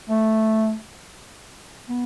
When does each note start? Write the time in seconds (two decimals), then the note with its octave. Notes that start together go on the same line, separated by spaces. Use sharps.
0.10 A3
1.89 B3